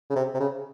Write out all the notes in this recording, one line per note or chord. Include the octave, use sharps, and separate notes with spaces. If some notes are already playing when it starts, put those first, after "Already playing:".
C#3
C3
C3
C#3